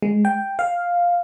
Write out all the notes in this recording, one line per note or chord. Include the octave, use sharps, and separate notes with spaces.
G#3
G5
F5